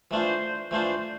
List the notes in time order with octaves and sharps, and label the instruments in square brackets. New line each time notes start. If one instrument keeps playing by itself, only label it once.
[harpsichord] E3 A3 D4 F4 [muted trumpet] C5
[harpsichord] E3 A3 D4 F4 [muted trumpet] C5